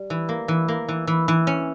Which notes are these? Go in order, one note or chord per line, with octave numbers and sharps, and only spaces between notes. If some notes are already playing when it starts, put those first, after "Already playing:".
Already playing: G3
E3
A#3
E3
A#3
E3
E3
E3
C#4